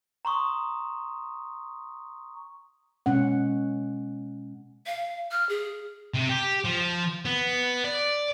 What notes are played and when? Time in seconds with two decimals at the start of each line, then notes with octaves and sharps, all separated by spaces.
0.25 A#5 C6 C#6 D#6
3.06 B2 G#3 C#4 F#5
4.86 F5
5.31 F6
5.49 G#4
6.14 C3
6.29 G4
6.65 F3
7.25 B3
7.84 D5